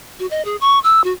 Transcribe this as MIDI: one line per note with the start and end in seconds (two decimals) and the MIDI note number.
0.19 0.26 66
0.31 0.42 75
0.45 0.56 68
0.61 0.79 85
0.84 1.04 88
1.04 1.12 66